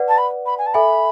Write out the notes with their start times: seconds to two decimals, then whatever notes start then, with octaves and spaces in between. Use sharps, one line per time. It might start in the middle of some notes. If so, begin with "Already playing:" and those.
Already playing: B4 D5 F#5
0.08 A5
0.18 B5
0.46 B5
0.58 G#5
0.66 A5
0.74 A4 E5 G#5 B5